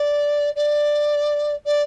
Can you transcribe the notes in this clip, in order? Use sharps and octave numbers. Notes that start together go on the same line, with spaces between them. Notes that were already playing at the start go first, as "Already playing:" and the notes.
Already playing: D5
D5
D5